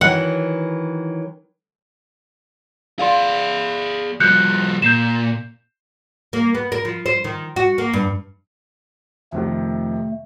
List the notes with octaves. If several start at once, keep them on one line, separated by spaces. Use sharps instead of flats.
D#3 E3 F#3 F#5
G#4 D5 F5 C6
F3 G3 F#6 G6 C#7
A#2 G6 C7 E7
A#3
B3
A#4
F3
C5
D#3
F#4
A#3
G2
F2 C3 D#3 A3